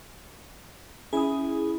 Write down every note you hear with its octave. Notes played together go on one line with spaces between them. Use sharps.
C#4 E4 G#4 D#6